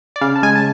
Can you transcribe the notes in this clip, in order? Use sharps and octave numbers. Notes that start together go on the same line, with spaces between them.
D5
C#3 F5
A5
G#3 G#5
A5